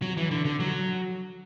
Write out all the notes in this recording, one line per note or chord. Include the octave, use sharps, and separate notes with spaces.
F#3
E3
D3
D3
F#3